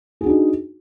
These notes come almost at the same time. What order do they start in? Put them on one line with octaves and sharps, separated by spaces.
G#4 F#4 D4 D#4